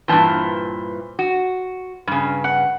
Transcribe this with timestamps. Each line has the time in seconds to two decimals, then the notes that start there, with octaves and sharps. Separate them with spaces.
0.08 G2 A#2 E3 C5 A5
1.19 F#4
2.07 G2 C#3
2.44 F#5